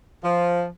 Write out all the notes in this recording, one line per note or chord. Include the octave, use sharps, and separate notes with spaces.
F3